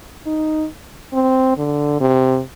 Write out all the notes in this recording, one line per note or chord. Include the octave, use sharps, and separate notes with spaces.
D#4
C4
D3
C3